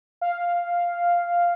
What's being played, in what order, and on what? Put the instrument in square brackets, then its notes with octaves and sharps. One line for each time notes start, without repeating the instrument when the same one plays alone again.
[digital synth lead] F5